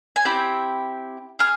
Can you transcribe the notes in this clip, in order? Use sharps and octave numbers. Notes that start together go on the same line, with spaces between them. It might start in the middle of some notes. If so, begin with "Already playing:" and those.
G#5
C4 E4 G4 G5
G#4 F6